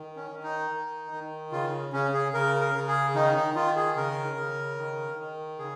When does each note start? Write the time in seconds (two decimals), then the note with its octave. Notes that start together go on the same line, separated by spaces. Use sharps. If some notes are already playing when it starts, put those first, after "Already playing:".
Already playing: D#3
0.16 C#4
0.31 D#3
0.44 D#4
0.71 D#3
1.12 D#3
1.52 C#3 F4
1.93 C#3 C#4
2.14 G#4
2.33 C#3 A#4
2.61 A#4
2.75 C#3
2.88 G#4
3.15 D#3 D#4
3.36 D#4
3.56 D#3 F4
3.76 G#4
3.96 C#3 A#4
4.37 C#3
4.78 D#3
5.19 D#3
5.59 C#3 G#4